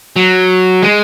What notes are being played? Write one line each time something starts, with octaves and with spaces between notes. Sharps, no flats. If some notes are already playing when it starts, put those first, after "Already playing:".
F#3
G#3